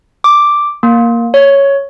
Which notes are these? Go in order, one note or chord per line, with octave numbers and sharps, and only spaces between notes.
D6
A#3
C#5